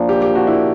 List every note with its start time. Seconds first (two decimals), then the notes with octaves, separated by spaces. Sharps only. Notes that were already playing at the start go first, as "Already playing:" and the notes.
Already playing: A#2 F3 A#3 D4
0.09 G4
0.22 G4
0.35 F#4
0.47 E4